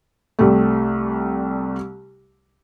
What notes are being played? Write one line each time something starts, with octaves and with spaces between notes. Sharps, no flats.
C2 G3 A3